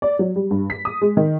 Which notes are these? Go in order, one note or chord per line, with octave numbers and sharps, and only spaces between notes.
D5
F#3
G3
G2
B6
D#6
G#3
D#3